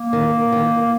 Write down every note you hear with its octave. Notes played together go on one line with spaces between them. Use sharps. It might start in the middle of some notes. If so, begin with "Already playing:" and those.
Already playing: A#3
D#3
D#3
A#3